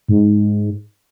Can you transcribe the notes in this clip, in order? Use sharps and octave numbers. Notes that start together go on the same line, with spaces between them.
G#2